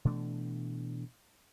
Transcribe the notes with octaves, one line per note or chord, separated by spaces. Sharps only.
B2 E3 A3 D4